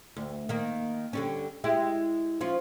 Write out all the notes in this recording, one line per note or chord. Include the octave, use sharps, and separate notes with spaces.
D2
D#3 A#3
D3 G3 C#4
G#3 E4 G4
F3 C#4 F4